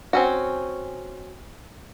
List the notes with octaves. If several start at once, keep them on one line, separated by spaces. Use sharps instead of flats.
C4 C#4 F#4